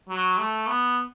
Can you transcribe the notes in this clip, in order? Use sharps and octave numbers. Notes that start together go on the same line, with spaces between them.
F#3
A3
B3